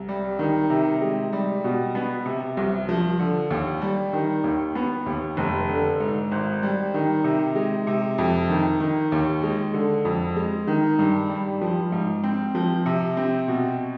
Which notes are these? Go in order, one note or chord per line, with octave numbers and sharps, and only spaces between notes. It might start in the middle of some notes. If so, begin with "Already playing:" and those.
Already playing: C2
G3
D#3
C3
G#3
G3
B2
B3
C3
C2
F3
D3
D#2
G3
D#3
D#2
B3
D#2
F1
D3
G#2
G#1
G3
D#3
C3
G#3
C3
F2
D#3
D#3
D#2
G#3
D3
F2
G#3
D#3
G2
G3
F3
G#2
C4
F3
C3
C4
B2